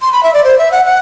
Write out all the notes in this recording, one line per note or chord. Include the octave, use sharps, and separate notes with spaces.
C6
B5
E5
D5
C5
E5
F#5
F#5